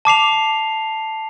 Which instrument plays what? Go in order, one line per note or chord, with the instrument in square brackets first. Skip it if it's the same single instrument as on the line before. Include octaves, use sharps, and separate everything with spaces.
[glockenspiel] A5 D6 C7 F7